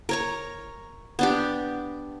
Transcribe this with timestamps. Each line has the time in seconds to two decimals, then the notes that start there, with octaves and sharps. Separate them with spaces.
0.09 A#4 C#5 A#5
1.19 B3 D4 G4